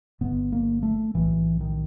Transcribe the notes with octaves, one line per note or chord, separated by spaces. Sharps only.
G1 G2 D3 B3
A#3
A3
B1 A2 E3
D#3